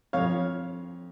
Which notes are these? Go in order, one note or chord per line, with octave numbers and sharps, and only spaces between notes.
F2 C#5 F5